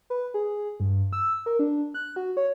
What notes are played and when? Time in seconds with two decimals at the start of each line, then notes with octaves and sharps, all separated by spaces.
0.10 B4
0.34 G#4
0.80 G2
1.13 E6
1.46 A#4
1.59 D4
1.94 F#6
2.16 F#4
2.37 C#5